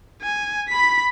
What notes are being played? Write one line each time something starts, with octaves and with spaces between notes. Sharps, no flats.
G#5
B5 B6